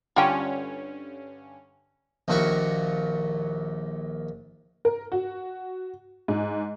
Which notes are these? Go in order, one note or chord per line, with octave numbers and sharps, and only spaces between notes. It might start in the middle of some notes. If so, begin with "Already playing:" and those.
G2 D3 C#4 F4 G5
A#1 D#2 A#2 E4 F#4 C#6
A#4
F#4
G#2